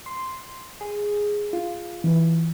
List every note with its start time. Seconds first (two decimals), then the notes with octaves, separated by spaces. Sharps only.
0.06 C6
0.81 G#4
1.53 F4
2.04 E3